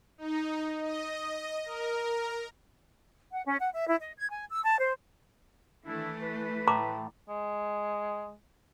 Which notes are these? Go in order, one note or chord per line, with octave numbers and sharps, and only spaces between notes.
D#4
D#5
A#4
F#5
C#4
F#5
E5
E4
D#5
G#6
G#5
E6
A5
C5
D#3 E3 A3 D4 E4
B4
A2 A#5 D6
G#3